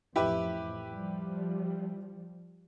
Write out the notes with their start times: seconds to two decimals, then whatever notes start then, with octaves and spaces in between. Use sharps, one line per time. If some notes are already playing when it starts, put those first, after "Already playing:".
0.16 A1 F2 E4 G4 B4
0.92 F3 G3